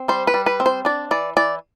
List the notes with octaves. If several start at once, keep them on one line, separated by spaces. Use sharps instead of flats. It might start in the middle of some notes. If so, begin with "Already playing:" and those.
Already playing: C4
G3 C5
B4
G3
B4
C4
C5
D4 D5
E3 D5
E3 D5